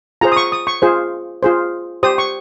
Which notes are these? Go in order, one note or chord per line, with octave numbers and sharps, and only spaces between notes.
F4 G#4 C5 A#5
D#6
C#6
D#6
C#6
F4 G#4 C5
F4 G#4 C5
G4 C5 D#6
C#6